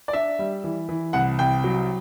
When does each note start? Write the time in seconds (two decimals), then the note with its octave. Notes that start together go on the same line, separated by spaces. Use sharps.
0.08 D5
0.13 D4 E5
0.39 G3
0.64 E3
0.89 E3
1.13 C2 F#5
1.39 C2 G5
1.64 F#3